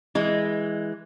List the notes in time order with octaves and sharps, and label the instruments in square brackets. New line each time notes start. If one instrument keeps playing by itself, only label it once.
[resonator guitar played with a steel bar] E3 G#3